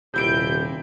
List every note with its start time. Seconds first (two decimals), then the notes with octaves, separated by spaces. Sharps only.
0.14 D#1 C3 E4 G6 D7